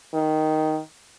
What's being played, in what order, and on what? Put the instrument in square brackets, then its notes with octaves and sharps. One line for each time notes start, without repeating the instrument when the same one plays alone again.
[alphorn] D#3